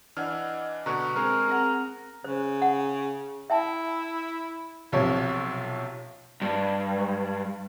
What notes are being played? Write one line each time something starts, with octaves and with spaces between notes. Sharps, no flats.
E3 D4 D#5 F#5 E6 F6
B2 D3 B3 A#5 C#6 F#6
G#3 C4 G#4 A#4
C4 G#4 F#5 A#5 A#6
C#3 C5
F#5
E4 E5 G5 A5
B1 C3 F3 C#5
G2